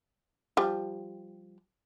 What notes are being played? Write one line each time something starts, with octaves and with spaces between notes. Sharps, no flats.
F3 G3